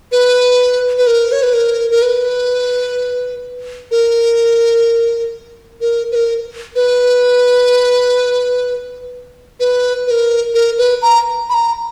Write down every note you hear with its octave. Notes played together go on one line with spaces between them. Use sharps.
B4
B4
A#4
C#5
B4
A#4
A#4
B4
A#4
A#4
B4
A#4
B4
B4
B4
A#4
A#4
B4
A#5
B5
A#5